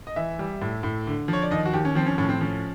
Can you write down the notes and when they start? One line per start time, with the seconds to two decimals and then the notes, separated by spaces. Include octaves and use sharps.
0.07 D#5
0.16 E3 E5
0.39 G3
0.62 A2
0.83 A2
1.07 D3
1.28 F3 C#5
1.42 D5
1.51 D#2 D#5
1.65 F#4
1.73 D#2 G4
1.85 C#4
1.95 F3 C4
2.06 C#4
2.18 A2 C#4
2.29 C4
2.41 F3 C#4